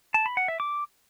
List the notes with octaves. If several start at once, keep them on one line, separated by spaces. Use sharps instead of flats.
A5
B5
F#5
E5
D6